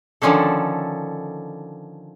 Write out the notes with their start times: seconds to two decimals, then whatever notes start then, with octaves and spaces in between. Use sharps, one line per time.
0.22 D3 D#3 F3 C#4 D4 A4